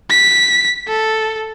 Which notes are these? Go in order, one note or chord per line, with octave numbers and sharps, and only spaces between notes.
B6
A4